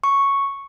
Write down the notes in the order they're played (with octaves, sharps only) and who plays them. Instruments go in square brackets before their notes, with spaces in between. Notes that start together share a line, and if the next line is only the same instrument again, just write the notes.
[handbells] C#6